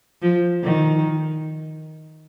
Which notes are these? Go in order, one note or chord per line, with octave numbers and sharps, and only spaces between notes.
F3
D#3